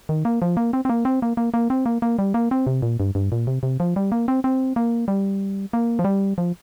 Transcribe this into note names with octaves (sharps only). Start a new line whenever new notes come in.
D#3
A#3
F3
A#3
C4
C4
A#3
C4
A#3
A#3
A#3
C4
A#3
A#3
G3
A#3
C4
C3
A#2
G2
G2
A#2
C3
C3
F3
G3
A#3
C4
C4
A#3
G3
A#3
F3
G3
F3